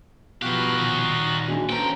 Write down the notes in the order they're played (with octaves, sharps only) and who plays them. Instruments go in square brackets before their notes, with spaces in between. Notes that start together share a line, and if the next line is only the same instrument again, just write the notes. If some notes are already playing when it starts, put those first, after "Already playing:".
[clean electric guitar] B2 F3 [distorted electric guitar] D#4 F5 [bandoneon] F#4 F#6 [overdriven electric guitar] G4 B4
[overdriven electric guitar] A#2 D#3
[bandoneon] B2 E3 G#3 [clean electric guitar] A#3 D4 F#4
[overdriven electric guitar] C#4 A4 [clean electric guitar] B4 A#5 [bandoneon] C5 [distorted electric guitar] G5